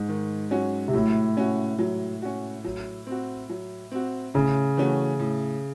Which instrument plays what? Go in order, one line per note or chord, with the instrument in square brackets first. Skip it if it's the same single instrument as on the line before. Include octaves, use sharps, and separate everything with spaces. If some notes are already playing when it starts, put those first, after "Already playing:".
Already playing: [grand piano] G#2
[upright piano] D#3
F#3 C#4 F#4
[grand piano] C3
[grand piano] A2 [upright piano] F#3
[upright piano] C#4 F#4
F#3
C#4 F#4
F#3
C4 F#4
F#3
C4 F#4
[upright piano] A2 [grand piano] C#3
[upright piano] E3 A3 C#4 F#4
A2